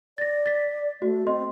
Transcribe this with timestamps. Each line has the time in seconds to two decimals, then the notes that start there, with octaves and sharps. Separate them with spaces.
0.18 D5 A6 A#6
0.46 A6 B6
1.02 A3 F#4
1.27 C4 D#5 C6